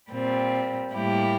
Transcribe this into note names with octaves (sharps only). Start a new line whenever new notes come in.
A#2 G3 C4
A2 G3 A#3 E4 G4